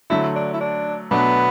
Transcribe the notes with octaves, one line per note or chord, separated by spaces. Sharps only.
D3 F#3 A3 E4
D4
E4
D4
B2 F#3 A3 B3 D4